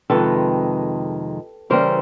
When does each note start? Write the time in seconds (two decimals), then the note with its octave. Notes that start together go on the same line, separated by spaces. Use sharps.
0.10 F2 C3 D#3 G#3 A4 B4
1.70 C#3 E3 G3 A#3 C#4 A#4 C5